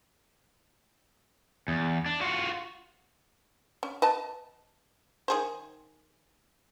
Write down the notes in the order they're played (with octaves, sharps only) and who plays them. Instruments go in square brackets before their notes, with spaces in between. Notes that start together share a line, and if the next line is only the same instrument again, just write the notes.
[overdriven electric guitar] E2
D4
F4 F#4
[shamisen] C#4
B4 D#5 A5
D#3 G#4 C5